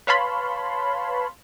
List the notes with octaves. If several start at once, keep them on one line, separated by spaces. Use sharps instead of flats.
B4 C#5 F5 A5 B5 C6